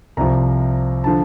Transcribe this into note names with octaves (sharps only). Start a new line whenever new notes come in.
C2 C3 F3 A#5
D3 F3 A5